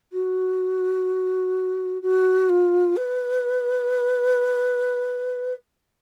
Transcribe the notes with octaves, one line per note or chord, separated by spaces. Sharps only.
F#4
F#4
F4
B4